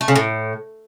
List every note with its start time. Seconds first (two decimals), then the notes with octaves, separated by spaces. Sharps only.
0.01 A3
0.08 C#3
0.15 A2